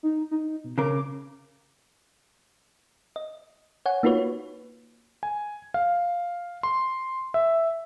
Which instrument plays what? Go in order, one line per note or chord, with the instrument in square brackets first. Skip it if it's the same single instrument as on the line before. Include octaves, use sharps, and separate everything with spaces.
[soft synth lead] D#4
D#4
B2
[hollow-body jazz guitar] C#3 A#4 [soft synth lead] D6
[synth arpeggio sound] D#5
C#5 F#5 G#5
A#3 D#4 F4 F#4 B4 C#5
[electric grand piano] G#5
F5
C6
E5